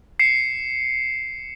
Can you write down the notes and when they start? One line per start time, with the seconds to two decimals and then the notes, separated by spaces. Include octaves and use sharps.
0.19 C7 C#7 E7